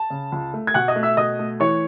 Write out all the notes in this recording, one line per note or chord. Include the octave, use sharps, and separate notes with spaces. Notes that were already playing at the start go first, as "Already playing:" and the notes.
Already playing: A5
C#3
C#2
A3
G#6
B2 F#5 F#6
D#5 D#6
A3
E5 E6
B2 D#5 D#6
A3
E3 C#5 C#6